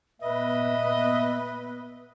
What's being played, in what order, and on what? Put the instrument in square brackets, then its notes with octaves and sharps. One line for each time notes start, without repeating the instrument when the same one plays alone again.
[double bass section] A#2 B3 [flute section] B4 [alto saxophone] D#5 [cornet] E5